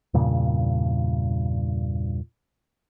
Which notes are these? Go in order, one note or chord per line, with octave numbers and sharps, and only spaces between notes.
E2 G2 A#2 C#3